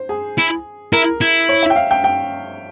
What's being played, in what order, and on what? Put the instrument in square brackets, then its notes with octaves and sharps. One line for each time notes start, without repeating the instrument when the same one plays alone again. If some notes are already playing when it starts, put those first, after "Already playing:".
Already playing: [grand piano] C5
G#4
[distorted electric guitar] E4
[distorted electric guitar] E4 [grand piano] A#4
[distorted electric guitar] E4
[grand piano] C#5
E5
G5
F5
G5
G5